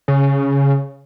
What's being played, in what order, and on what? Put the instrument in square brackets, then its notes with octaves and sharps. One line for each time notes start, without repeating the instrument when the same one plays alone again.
[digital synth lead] C#3